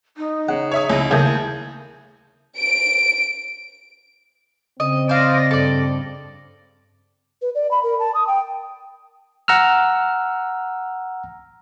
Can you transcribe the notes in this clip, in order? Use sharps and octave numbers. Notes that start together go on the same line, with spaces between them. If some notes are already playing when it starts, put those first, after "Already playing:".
D#4
C#3 F#5
C#5 E5 D#6
C#2 C#4 D#4 E4
D#2 C#3 A3 A#3 G#4 G6
D7
C#3 C4 D#5
C5 D5 D#5 F5
G2 A4 D5
B4
D5
B5
A#4
A5
D#6
G5
F#5 A#5 E6 F6